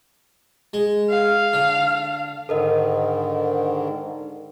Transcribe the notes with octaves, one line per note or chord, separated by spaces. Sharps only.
G#3
F5
D3
G#2 D3 D#3 A4 A#4 D#5